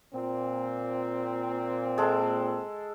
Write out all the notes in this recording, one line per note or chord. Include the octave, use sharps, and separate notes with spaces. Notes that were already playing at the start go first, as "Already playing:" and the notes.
A#2 C4
G#3 A4